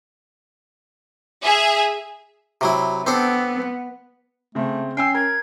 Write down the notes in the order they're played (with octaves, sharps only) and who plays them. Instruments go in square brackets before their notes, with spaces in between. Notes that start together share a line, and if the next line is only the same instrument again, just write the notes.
[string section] G#4 E5 G#5
[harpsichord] C3 F#3 E4
[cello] B3 [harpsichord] C4 D4 A4
[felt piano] C#3 C4 [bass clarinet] A3
[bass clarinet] C#4 [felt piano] G5 G#5 E6 [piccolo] C7
[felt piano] A#4 [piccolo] G#6